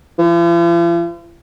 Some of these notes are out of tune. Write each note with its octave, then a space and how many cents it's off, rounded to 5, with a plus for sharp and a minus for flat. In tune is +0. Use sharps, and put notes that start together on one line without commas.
F3 -45